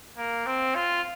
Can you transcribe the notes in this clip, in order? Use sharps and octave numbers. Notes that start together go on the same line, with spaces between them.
A#3
C4
F4